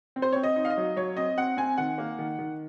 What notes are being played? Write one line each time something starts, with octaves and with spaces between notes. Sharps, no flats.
C4
C5
C4 C#5
D#5
D#4
F5
D#5
F#3
F#3 C#5
C4 D#5
C4 F#5
C4 G#5
D#3 F#5
A#3
D#3
D#3